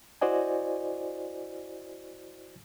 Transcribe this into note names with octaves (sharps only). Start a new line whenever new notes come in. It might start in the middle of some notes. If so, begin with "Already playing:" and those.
E4 F#4 C5 D5 D#5 G#5